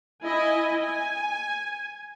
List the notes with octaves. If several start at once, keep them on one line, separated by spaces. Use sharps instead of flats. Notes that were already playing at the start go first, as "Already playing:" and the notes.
E4 D#5 G#5
G#5